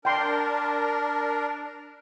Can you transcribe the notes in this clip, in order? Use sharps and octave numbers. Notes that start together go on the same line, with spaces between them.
D4 A#4 G5 C6